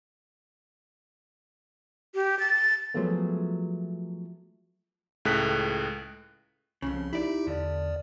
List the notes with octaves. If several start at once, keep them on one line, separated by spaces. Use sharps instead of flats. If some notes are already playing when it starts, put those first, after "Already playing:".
G4
A6
F3 F#3 G#3 A3 B3
C#2 A2 G#4 A4 F#6 B6
C2 F2 G#2 C#3
D#4 E4 G4 D5
E2 D3 D5